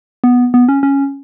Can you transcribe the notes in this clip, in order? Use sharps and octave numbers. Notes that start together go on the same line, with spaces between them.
B3
B3
C#4
C#4